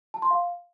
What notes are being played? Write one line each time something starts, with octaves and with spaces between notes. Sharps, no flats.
A5
C6
F5